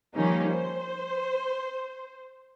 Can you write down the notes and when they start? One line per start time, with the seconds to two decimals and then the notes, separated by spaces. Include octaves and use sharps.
0.14 D#3 F3 G3 A#3 C#4 D#4
0.49 C5